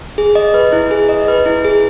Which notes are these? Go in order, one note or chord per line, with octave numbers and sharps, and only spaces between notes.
G#4
D#5
B4
E4
G#4
D#5
B4
E4
G#4